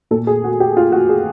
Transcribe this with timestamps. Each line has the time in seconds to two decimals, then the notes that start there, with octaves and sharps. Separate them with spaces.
0.11 A#2 A4
0.27 G#4
0.44 F#4
0.60 G4
0.77 F4
0.92 F#4
1.09 G#4